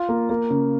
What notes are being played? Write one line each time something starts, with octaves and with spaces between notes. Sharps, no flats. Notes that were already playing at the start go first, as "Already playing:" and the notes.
Already playing: F4
A#3
A#3
C#3